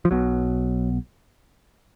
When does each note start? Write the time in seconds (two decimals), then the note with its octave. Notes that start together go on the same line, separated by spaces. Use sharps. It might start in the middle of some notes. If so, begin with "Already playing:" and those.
0.05 F3
0.11 B1 B2 F#3